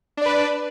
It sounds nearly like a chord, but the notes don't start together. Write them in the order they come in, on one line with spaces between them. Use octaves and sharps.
D4 D5 B4